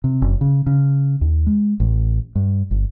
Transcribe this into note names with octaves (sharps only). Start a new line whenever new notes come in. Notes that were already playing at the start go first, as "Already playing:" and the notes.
C3
F#1
C#3
C#3
D#2
G#3
A1
G2
G1